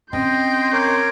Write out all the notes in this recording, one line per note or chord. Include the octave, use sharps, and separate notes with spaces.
C4 C#4 D#5 G5 C6 G6
A#4 C#5 D6